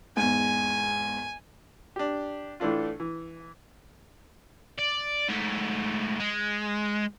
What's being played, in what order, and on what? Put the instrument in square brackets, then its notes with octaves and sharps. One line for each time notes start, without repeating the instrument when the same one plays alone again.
[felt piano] E2 G#2 [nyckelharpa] G#5
[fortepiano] D4 G4
A2 E3 A3 D4 F4
E3
[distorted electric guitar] D5
G#2 A3
G#3